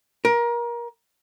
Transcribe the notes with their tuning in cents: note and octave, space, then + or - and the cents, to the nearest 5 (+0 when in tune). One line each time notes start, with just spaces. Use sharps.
A#4 +25